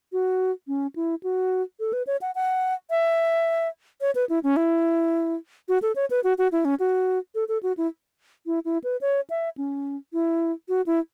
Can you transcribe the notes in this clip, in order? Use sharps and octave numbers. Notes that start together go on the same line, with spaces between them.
F#4
C#4
E4
F#4
A4
B4
C#5
F#5
F#5
E5
C#5
B4
E4
C#4
E4
F#4
A4
C#5
B4
F#4
F#4
E4
C#4
F#4
A4
A4
F#4
E4
E4
E4
B4
C#5
E5
C#4
E4
F#4
E4